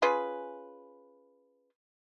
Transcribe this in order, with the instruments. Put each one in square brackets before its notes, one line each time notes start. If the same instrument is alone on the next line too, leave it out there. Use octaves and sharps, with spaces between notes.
[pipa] C#4 F4 G#4 B4